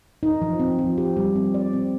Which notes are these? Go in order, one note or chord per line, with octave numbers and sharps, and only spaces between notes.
D#4
F3
C4
F3
G4
G3
C4
D5
C4